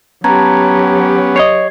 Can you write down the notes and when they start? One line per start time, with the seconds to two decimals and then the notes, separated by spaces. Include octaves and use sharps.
0.24 F#3 B3 C#4 G4 A5 A#5 G#6
1.36 C#5 D#5 G#6 C7